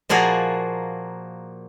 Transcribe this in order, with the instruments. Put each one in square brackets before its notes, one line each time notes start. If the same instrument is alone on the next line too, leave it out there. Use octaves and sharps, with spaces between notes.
[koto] A#2 F3 A#3 F#4 G#4